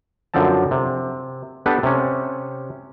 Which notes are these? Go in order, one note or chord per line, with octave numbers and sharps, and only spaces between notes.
F#2 D3 F3 C4 A5
C3
B3 D4 G4 A4 B4 A5
C3 C#4